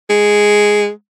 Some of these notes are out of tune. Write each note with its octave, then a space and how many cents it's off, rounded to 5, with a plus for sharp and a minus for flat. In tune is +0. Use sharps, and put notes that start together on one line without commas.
G#3 +0